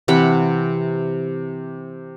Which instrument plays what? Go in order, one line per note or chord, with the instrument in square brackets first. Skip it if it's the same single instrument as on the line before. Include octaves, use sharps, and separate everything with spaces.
[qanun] C3 E3 F#5 B5